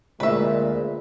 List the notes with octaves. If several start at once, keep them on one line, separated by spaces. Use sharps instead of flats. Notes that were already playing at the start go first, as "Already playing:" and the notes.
D2 A#2 G#3 B4 E5